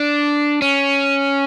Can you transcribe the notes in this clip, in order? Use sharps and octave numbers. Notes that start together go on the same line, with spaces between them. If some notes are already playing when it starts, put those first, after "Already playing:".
Already playing: D4
C#4